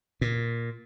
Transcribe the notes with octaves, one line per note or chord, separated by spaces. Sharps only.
A#2